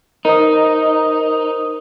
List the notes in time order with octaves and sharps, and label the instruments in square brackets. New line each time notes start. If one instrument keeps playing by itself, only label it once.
[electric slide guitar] D#4 [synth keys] A#4 C5 D#6